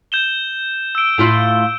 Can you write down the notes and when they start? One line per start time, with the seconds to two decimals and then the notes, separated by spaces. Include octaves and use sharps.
0.12 G6 E7 G7
0.95 E6 D7
1.18 A2 E4 F4